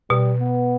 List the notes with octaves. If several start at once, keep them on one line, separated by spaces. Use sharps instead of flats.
B2 G3
B3